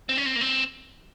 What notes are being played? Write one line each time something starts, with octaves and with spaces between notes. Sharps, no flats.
C4
C#4
C4
A#3
C4